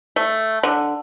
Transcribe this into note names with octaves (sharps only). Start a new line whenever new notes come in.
A3
D3